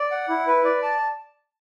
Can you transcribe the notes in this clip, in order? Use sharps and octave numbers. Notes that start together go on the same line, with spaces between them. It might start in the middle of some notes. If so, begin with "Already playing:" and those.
Already playing: D5
F#5
E4
B4
D5
A5